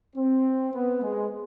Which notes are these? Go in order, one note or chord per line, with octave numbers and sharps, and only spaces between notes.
C4
B3
G#3